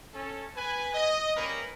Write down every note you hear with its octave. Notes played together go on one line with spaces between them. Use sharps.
C#4 A4
B4 G#5
D#5
G3 A#3 C#4 D#4 A#4 B4